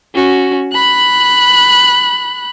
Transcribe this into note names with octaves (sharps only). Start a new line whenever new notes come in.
C#4 F#4
B5 F#6